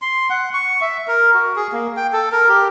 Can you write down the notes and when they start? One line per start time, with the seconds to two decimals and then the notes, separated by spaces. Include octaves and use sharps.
0.02 C6
0.30 F#5
0.54 C#6
0.81 E5
1.08 A#4
1.34 F#4
1.56 G#4
1.73 A#3
1.97 G5
2.12 A4
2.32 A#4
2.49 G4